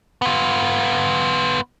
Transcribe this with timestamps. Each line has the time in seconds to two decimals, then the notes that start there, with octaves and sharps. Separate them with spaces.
0.22 B3 F4